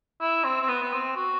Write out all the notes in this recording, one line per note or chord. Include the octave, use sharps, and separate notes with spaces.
E4
C4
C4
B3
B3
C4
F#4